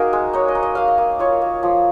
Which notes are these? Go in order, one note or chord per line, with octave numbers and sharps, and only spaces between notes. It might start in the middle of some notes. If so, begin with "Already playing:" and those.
Already playing: A#3 D#4 F#4 G#4 A#4
G#3
D#4 C#5
D#5
D#4
D#5
A#3 F5
D#5
A#3
F4 C#5
A#3
F3